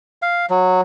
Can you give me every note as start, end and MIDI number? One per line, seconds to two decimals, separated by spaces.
0.22 0.46 77
0.50 0.81 54